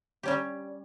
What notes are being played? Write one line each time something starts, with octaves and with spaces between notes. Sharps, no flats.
G3 C#4 G4